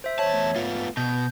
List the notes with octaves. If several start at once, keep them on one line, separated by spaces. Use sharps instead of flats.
C5 E5
E2 C#5 E5 A5
A3
B3 F4
B2 G6